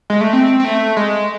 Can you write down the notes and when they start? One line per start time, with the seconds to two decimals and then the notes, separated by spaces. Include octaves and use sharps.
0.10 G#3
0.21 A3
0.33 C4
0.60 C4
0.65 A3
0.97 G#3